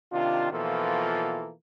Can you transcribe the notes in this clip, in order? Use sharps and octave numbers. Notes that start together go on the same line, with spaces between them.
C3 D#3 D4 F4
B2 E3 F3 A#3 F4 A4